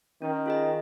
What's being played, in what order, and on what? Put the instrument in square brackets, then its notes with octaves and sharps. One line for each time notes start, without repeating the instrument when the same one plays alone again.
[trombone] D#3 [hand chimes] C#4
[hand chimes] F4 G#4 D#5